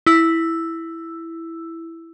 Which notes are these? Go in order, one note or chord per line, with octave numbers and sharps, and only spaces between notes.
E4 E6